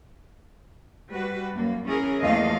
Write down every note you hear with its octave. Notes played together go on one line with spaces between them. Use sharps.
G3 F#4 B4
F#2 A#3
E3 C#4 G#4 A#4
E2 F3 A3 A#3 D#5 F5